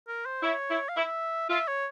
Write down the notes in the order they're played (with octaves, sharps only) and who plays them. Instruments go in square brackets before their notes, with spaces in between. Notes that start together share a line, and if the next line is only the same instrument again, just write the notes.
[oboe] A#4
C5
[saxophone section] E4 [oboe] C#5
[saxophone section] E4
[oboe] F5
[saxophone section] E4 [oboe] E5
[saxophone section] F4 [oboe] E5
[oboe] C#5